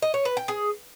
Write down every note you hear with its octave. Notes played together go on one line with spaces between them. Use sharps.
D#5
C#5
B4
G5
G#4